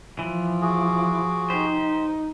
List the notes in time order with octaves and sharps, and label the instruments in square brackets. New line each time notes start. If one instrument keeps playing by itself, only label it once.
[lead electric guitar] E3 [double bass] F3
[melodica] F#4 G#4 [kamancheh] D6
[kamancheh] D#4 [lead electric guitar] G4 C5